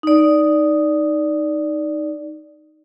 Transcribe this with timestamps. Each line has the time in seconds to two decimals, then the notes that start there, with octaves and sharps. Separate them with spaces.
0.03 D#4 D5